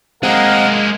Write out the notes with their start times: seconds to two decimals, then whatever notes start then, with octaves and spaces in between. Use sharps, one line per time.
0.23 G#3 A#3 C4 G#4 A#4 D#5 F5 F#5